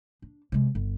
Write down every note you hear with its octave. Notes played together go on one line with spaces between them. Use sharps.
D4
C3 G#3
G1